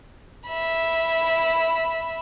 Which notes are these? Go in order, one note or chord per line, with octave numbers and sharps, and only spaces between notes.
E5 B5